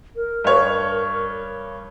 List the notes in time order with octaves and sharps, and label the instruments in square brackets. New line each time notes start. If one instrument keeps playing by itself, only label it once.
[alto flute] A#4
[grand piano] G2 C#5